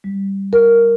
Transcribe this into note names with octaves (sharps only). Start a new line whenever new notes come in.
G3
A#4